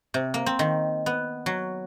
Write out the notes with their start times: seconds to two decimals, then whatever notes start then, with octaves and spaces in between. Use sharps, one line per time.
0.14 C3
0.34 A#3
0.46 C4
0.59 D#3
1.06 B3
1.46 F#3